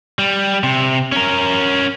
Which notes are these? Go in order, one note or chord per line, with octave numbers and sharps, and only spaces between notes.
G3
C3
C#4 A#4